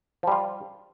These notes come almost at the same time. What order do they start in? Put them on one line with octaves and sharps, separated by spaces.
F3 G3 F4